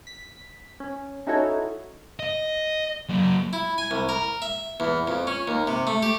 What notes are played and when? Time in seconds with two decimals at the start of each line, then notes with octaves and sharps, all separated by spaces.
0.07 B6
0.80 C#4
1.27 C#4 D#4 E4 F#4 A4 C#5
2.20 D#5
3.09 F#3 A#3
3.53 E4
3.78 G#5
3.91 C2
4.09 A#4
4.42 E5
4.80 E2
5.08 F2
5.27 C#4
5.48 D#2
5.67 C3
5.87 A3
6.02 G4